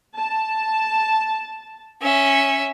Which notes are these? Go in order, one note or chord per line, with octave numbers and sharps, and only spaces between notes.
A5
C#4 E5